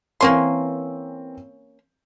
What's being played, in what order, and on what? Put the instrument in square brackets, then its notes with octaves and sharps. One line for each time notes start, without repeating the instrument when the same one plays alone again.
[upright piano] E3 C4 A#4 [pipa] A#3 C#4 C6